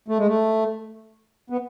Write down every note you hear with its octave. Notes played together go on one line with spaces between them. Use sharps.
A3
G#3
A3
B3